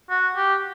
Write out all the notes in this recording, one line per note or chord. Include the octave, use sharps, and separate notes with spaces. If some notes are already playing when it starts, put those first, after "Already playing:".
F#4
G4